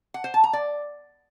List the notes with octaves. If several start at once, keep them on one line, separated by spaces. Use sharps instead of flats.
F#5
C5
A5
A#5
D5